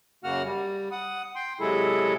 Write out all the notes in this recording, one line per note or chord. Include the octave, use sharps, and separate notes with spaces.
F#2 C#3 A#3 F#4 F#5 F6
G3
F#5 D#6
G5 C6
C3 F#3 G#3 E4 G#4 A4